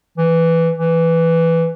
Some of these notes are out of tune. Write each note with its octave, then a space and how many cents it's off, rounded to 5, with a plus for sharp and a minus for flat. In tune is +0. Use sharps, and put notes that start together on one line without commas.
E3 +5
E3 +5